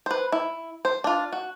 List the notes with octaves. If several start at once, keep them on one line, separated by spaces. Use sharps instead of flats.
B4 C5
E4
C5
D4 F4
F#4